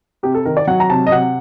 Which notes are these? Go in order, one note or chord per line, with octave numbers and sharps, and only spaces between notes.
C3 G4
A4
D#3 A#4
D5
F#3 F#5
A#5
C3 A5
D#5
C3 F#5